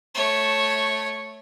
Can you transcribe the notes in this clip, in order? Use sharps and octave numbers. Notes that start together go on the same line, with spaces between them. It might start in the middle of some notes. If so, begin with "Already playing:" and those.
A3 C#5